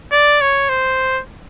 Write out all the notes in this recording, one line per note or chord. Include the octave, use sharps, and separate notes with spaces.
D5
C#5
C5